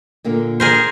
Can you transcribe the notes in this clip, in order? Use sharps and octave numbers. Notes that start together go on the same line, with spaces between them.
A#2 D3 A#3
G#4 A#4 C5